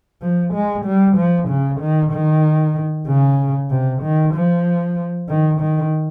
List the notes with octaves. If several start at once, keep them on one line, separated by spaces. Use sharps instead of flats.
F3
G#3
G3
F3
C#3
D#3
D#3
C#3
C3
D#3
F3
D#3
D#3